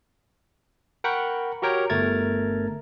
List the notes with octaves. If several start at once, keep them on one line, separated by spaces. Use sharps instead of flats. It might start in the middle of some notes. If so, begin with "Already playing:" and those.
A#4 F#5 G5 B5 C#6
F#4 G4 A#4 C#5 G5
G1 A3 A#4 G#6 A6